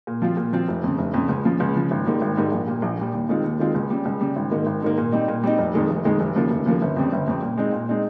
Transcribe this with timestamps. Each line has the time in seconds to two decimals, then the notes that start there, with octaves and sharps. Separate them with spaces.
0.07 A#2
0.22 F3 C4 F4
0.37 A#2
0.53 F3 C4 F4
0.68 F1
0.84 F2 C#3
0.98 F1
1.14 F2 C#3
1.29 C#2
1.45 C#3 F3
1.60 C#2
1.76 C#3 F3
1.91 G#1
2.07 G#2 G3 A#3
2.21 G#1
2.37 G#2 G3 A#3
2.51 A#1
2.68 A#2 G3
2.82 A#1
2.98 A#2 G3
3.14 D#2
3.29 D#3 G#3 C4 F4
3.44 D#2
3.59 D#3 G#3 C4 F4
3.74 C#2
3.90 C#3 G3
4.05 C#2
4.21 C#3 G3
4.36 G#1
4.51 G#2 D#3 A#3
4.66 G#1
4.82 G#2 D#3 A#3
4.98 A#2
5.12 G3 C4 D#4
5.28 A#2
5.44 G3 C4 D#4
5.58 F1
5.74 F2 D#3 G#3
5.90 F1
6.05 F2 D#3 G#3
6.20 F1
6.36 D#2 C#3 F3 A#3
6.50 F1
6.66 D#2 C#3 F3 A#3
6.82 G1
6.96 F2 C#3 G3 C4
7.13 G1
7.27 F2 C#3 G3 C4
7.42 A#2
7.57 G#3 C4 D#4
7.73 A#2
7.89 G#3 C4 D#4